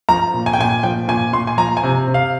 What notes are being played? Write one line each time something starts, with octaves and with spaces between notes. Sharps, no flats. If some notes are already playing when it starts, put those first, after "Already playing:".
F3 A#5
A#2
G#5
G5
A#2 G#5
F3 G5
A#2 G#5
A#2 C6
G#5
F3 A#5
G#5
C3
C3
F5